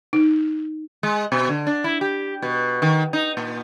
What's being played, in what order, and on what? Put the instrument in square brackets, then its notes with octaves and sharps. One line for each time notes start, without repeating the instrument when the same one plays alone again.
[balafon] D#4
[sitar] G#3
B2
D3
D4
E4
G4
B2
D#3
D#4
A#2